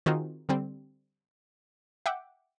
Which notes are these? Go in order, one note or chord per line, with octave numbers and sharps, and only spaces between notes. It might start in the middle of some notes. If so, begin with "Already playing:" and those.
D#3 C4 D#4 F4 F#4 G#4
D3 G3 C4
E5 F#5 G5 D6